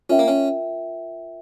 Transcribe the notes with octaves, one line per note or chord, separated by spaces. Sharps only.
C#4 F4 A#4 E5 G5
A#3
C#4